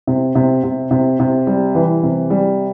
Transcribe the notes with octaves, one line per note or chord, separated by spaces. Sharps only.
C3
C3
C3
C3
C3
G3
E3
C3
G3